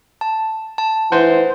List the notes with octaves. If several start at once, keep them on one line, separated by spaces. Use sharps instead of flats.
A5
A5
E3 C5 F#5 C6